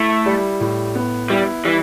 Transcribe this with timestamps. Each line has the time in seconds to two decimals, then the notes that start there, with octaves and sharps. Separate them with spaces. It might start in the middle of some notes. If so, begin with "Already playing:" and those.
Already playing: A3 E4
0.26 G3
0.60 A2
0.95 B3
1.30 G3 E4
1.64 E3 G3